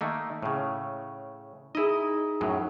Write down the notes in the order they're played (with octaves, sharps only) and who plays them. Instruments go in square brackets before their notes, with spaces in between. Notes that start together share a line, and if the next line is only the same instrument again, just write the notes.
[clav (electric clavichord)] D#3 A3 A#3
A2 C#3
[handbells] D#4 G#4 [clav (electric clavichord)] E4 D#5
[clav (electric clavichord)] F#2 A2 F#3